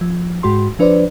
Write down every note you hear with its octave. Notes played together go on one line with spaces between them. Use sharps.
F3
G#2 G#3 F#4 C6
F3 D4 B4 C5 D5